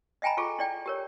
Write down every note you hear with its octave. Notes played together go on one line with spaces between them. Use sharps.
D#5 E5 G5 G#5 A#5 B5
F4 G#4 A4 C#6
E4 D5 G5
G4 A#4 C#5